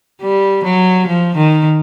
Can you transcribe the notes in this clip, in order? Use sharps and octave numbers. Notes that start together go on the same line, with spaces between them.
G3
F#3
F3
D#3